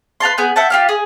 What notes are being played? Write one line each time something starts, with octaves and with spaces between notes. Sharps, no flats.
B4 F5 A5 C6
B3 G#4 G6
E5 F#5 G5 A5
F4 G4 F5
G#4